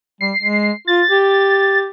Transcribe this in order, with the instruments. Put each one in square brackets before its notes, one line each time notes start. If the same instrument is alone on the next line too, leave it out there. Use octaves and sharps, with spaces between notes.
[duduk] G3 [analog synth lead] C7
[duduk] G#3
[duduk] F4 [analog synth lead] A6
[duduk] G4